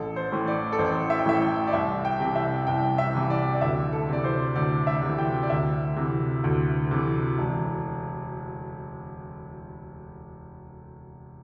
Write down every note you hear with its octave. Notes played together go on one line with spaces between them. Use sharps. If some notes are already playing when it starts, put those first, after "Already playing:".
Already playing: A1 A4
C5
A2 E3
D5
A4
A1 C5
E5
G5
A2 E3 E5
G5
D5
C2 E5
G5
C3 E3
E5
C2 G5
E5
C3 E3
D5
D5
D2 E5
A4
C3 E3 D5
C5
D2 D5
E5
C3 E3
G5
D5
D2 E5
C3 E3
D2
C3 E3
E1